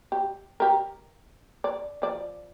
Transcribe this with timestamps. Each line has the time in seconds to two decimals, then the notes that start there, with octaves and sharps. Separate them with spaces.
0.12 G4
0.60 G4 A#4
1.64 D5
2.02 F3 D5